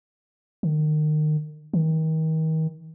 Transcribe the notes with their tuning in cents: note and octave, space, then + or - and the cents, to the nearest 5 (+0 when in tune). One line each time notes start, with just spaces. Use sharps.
D#3 -30
D#3 +35